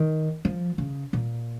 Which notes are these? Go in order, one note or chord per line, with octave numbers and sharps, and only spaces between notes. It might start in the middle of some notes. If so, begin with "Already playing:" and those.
Already playing: D#3
F3
C#3
A#2